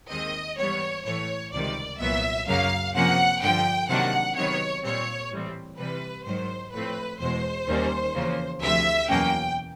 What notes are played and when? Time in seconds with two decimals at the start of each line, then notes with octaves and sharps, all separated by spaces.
0.10 D#2 D#3 G#3 C4 D#5
0.58 G#2 E3 G3 B3 C#5
1.05 A2 E3 A3 C#5
1.52 C#2 C3 D#3 G3 D5
2.00 C2 A#2 F#3 B3 E5
2.47 F#2 C#3 F#3 A#3 F5
2.95 C3 F3 A#3 C#4 F#5
3.42 G2 D3 F3 G5
3.89 C3 D#3 F#3 A#3 D4 F#5
4.36 C3 D#3 F#3 B3 C#5
4.83 A#2 G3 C4 C#5
5.31 A2 E3 G3 C4
5.78 C3 E3 G3 B4
6.26 G#2 D#3 F#3 C5
6.73 A2 F3 A3 C4 B4
7.20 E2 B2 G#3 C5
7.68 D#2 D#3 G3 A#3 C#4
8.14 E2 C#3 F3 A#3
8.62 D2 C3 F3 E5
9.09 E2 B2 F#3 A#3 C#4 G5